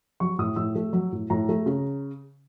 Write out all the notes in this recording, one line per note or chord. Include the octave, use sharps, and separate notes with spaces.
F#3 C#6
A2 D#6
A2 E6
A3
F#3
A2
A2 A#5
A3
C#3